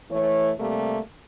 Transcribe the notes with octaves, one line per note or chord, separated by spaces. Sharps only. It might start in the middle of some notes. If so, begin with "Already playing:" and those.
E3 A3 C#5
C3 G3 A3 A#3